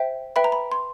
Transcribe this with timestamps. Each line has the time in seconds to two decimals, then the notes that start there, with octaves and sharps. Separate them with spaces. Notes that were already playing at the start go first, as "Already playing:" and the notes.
Already playing: C5 E5 G5
0.36 B4 E5 G5 B5
0.44 A#5
0.52 B5
0.72 C6